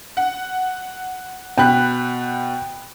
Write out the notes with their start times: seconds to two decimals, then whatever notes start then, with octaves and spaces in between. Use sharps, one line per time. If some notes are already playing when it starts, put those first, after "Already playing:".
0.17 F#5
1.58 B2 G5 B5 F#6